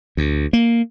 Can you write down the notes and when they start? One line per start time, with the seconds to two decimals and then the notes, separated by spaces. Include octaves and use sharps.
0.17 D2
0.53 A#3